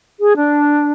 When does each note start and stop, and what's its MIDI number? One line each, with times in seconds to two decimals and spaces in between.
0.19 0.37 68
0.37 0.91 62